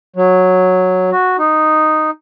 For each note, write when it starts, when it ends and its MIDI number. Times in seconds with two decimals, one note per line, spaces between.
0.16 1.10 54
1.11 1.37 66
1.38 2.10 63